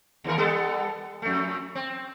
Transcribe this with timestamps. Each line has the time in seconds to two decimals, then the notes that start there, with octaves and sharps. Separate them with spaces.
0.24 D#2 E3 A#4
0.38 G3 B3 A4
1.22 F2 A3
1.75 C4